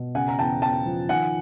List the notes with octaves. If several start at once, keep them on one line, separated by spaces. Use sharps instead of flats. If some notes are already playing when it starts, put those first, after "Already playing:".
Already playing: B2
C#3 F#5 G#5
A#5
E2 G5 A5
E2 G5 A5
F3
D#3 F#5 G#5